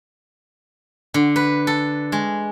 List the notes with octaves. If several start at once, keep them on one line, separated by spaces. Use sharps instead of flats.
D3
B4
A4
G#3